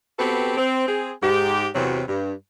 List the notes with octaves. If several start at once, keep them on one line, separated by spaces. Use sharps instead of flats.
B3 C4 F#4 G4 A4 B4
C4
C4 G#4
G#2 G4
E2 C3 F#3
G2